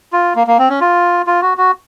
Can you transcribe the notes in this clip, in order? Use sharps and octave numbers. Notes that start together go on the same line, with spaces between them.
F4
A#3
A#3
C4
C#4
F4
F4
F#4
F#4